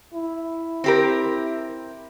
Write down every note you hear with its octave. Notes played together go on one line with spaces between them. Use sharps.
E4
C4 G4 A#4